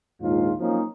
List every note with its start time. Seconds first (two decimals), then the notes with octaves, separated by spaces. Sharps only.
0.21 A#1 D#2 G#2 D#4 F4
0.60 F3 F#3 A#3 C4 C#4 D#4